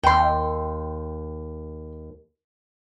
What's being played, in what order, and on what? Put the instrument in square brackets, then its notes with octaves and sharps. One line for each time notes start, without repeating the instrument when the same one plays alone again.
[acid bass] D#2 [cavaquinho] G5 C6